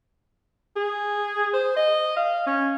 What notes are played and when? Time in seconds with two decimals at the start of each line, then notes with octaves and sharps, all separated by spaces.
0.76 G#4
1.54 C5
1.76 D#5
2.16 F5
2.46 C#4